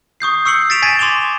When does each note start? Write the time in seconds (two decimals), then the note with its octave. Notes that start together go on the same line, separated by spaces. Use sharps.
0.20 C#6 D#6 G6 C7
0.45 C#6 E6 C7 C#7 F#7
0.70 A6 B6 D7 E7 F7
0.82 G#5 G#6 A6 B6 D7 D#7
0.99 C6 D6 E7 F7 G7